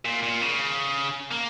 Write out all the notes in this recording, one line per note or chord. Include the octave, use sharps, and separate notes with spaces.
A#2
A#2
C#3
A#3